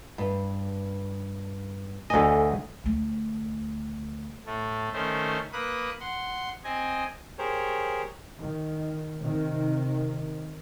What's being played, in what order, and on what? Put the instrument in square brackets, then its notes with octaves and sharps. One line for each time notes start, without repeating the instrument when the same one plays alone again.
[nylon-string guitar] G2
[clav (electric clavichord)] D2 D#5 [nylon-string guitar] A4 G#5
[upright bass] D2 A3
[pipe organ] A2 A3
D#3 A3 C#4 C5
A#3 B4 D#6 F#6
F#5 C6
C4 D#5 G#5
[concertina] G4 G#4 A#4 C5 C#5
[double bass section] D#3
C3 D#3